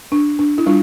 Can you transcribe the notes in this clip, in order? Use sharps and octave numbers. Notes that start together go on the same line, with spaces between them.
D4
D4
E4
G3 D4 F4